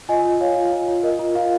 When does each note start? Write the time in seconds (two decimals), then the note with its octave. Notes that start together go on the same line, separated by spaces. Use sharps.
0.09 F4 D#5 G#5
0.25 F4
0.41 C#5 F5
0.57 F4
0.72 F4
0.88 F4
1.03 A#4 D#5
1.19 F4
1.35 F4 F5